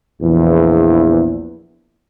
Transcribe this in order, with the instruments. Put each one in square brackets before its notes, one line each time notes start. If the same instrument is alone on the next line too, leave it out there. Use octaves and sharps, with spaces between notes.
[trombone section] A#1 E2